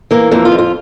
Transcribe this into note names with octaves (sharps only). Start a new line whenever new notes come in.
E3 A#3
F2 A#3
F4
F2
F4